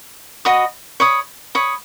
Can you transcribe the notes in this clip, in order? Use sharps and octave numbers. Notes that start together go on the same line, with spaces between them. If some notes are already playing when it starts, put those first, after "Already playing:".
F#4 D#5 B5 D#6
C#5 B5 D#6
C#5 B5 D#6